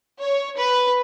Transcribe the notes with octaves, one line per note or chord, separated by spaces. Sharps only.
C#5
B4